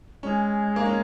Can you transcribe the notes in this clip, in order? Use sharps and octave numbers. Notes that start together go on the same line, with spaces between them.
G#3 C#4
A#3
C#4